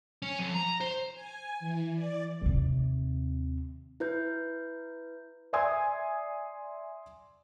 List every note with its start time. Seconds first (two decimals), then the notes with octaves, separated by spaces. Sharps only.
0.22 C#4
0.39 F2
0.54 A#5
0.80 C5
1.14 G#5
1.60 E3
1.95 D5
2.42 D#2 C3
4.00 E4 B4 G6
5.53 D5 E5 G#5 C6 D#6 G#6